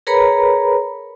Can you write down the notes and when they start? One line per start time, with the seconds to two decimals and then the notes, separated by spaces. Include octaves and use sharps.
0.07 G#4 A#4 B4 C#5 A#5 B5